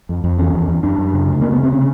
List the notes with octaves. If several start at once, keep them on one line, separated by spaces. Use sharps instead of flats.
F2
F2
E2 C#4
E2
E2
F#2 D4
F#2
C#3
D2
C#3 A#3
B3
C#3
C4
C3 C#4